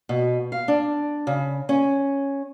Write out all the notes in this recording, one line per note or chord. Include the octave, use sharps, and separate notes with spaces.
B2
F5
D4
C#3
C#4